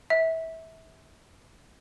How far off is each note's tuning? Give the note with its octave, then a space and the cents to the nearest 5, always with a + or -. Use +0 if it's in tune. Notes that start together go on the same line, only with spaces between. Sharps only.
E5 -25